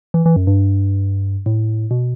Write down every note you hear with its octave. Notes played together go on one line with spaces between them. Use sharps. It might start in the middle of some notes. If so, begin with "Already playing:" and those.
E3
E3
F#2
G2
A2
B2